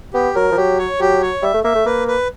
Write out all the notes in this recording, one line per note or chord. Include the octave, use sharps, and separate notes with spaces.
B3 G4
F#3 A#4
F3
F#3 G4
C#5
F#3 G4
C#5
G3 E5
A3
A#3 E5
A3
A#3 B4
B4